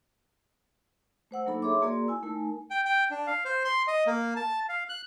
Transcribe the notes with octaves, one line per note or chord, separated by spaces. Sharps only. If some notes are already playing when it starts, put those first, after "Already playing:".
A3 C5 F#5 E6
F#3 A#3 D4 D#4 A4 B5
G#4 C#5 E5 C6 D6
A#3 F#4 G#4 A#4 D5 C6
E4 G#5 E6
A3 D#4 A#4 G#5
G5
G5
D4
F5
C5
C6
D#5
A#3
A5
F5
F#6